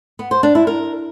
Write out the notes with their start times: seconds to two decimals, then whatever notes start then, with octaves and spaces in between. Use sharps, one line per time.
0.19 B3
0.31 C5
0.43 D4
0.55 E4
0.67 A#4